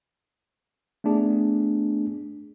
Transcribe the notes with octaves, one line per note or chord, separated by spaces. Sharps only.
A3 B3 D4 G#4